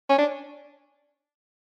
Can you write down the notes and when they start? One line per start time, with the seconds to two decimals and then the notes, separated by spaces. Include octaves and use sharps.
0.09 C#4
0.18 D4